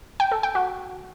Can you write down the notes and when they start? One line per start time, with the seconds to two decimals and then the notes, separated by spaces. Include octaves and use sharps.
0.20 G5
0.32 A4
0.43 G5
0.55 F#4